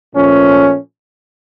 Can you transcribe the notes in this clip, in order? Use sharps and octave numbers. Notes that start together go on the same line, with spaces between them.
A#2 F3 A3 C#4